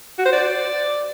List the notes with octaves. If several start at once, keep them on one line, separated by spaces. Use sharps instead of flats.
F#4
C5
D5